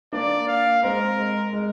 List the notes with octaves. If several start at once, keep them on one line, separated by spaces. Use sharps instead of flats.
A#3 D4 D5
F5
G#3 C4 A#4
G#3
G#3